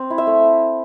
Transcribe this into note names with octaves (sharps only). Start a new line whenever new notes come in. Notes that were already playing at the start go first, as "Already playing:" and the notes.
Already playing: C4
E4
E5
A3